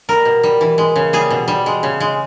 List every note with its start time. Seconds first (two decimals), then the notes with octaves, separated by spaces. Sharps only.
0.09 G3 A#4
0.25 B2
0.43 G3
0.61 E3
0.78 G#3
0.96 C#3
1.13 G3 G#4
1.31 B2
1.48 G3
1.66 G#3
1.83 C#3
2.00 G#3